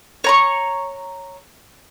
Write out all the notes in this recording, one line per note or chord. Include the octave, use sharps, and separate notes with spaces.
C#5 A#5 C#6